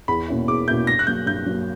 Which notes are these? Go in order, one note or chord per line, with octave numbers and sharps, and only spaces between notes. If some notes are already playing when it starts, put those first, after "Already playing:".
E2 B5
B2 A#3 C#4 E4
E2 D6
B2 A#3 C#4 E4 G6
G2 A#6
F#6
F#3 A#3 G6
G2 G6
F#3 A#3